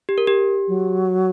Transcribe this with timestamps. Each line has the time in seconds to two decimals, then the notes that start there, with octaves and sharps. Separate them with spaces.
0.09 G4
0.18 A#4
0.27 G4
0.68 F#3